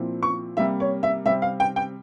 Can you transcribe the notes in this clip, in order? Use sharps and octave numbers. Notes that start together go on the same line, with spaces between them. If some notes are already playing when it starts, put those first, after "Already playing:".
Already playing: A#2 F3 C4 E4
C#6
C3 G3 A#3 E5
C#5
E5
C3 G3 C4 E5
F5
G5
G5